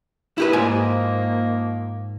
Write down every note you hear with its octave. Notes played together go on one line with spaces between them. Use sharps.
E4 G4 B4
G#2 D#3 F3 A#3 G#5